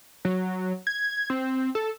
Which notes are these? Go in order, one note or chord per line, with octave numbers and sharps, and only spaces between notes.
F#3
G#6
C4
A4